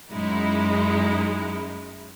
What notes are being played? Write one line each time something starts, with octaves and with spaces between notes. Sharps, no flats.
F#2 F#3 G#3 D#4 E4